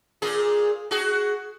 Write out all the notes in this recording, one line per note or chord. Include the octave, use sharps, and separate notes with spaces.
A#2 G#4
F#4 G#4